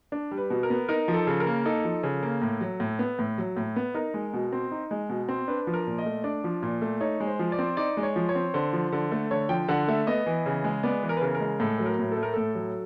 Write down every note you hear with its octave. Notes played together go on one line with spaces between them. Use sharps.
D4
G3
B4
B2
A#4
B3
D#4 A#4
F3
A4
C#3
A#4
A#3
D#4 A4
F3
C#3
A#3
A2
F#3
A2
B3
A2
F#3
A2
B3
D#4 A#4
G#3
B2
C4
D#4
G#3
B2
C4
D4 B4
F3
A#4
A#2
D#5
A3
D4 D5
F3
A#2
A3
D#4 C#5
G#3
C5
F3
D5
C4
D#4 D5
G#3
C#5
F3
C#5
C4
D3 C5
F3
D3
A3
D3 C#5
F3 G5
D3 F#5
A3 E5
B3 D#5
E3
C#3
G#3
B3 D5
E3
A#4
B4
C#3 A#4
A#4
G#3
A2 A4
F#3 A4
A#4
A2
A4
A3
A#4
A2 A4
F#3